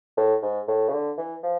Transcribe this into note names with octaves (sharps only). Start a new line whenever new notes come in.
A2
G#2
A2
C#3
D3
E3
F3